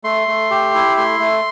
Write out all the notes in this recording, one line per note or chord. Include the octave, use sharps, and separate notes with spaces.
A3 C6
A3
G4
E4
A3 C6
A3